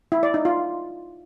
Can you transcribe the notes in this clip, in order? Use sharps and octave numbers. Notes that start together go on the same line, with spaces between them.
E4
D5
D#4
F4